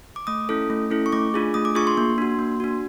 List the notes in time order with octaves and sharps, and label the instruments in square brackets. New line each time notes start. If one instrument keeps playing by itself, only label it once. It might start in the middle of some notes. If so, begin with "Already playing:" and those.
[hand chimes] D6
A3 D#6
C#4 E4 A4
A3
C#4 E4 A4
C#6
A3 D6
D4 F4 G#4
A3 D#6
D6
D4 F4 G#4 C#6
C6
A#3
D4 F#4
A#3
D4 F#4